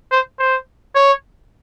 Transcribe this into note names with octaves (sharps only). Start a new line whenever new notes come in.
C5
C5
C#5